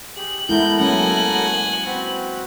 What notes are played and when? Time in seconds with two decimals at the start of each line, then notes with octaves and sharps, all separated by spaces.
0.16 G4 G#4 F#7
0.49 G#3 A3 B3 E4 A#4 G6
0.79 F#3 A#3 C#4 F#5 G#5
1.85 C4 F#4 B4